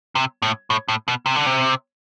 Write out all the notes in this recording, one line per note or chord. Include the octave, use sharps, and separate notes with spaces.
C3
A2
A2
A2
B2
C3
D3
C3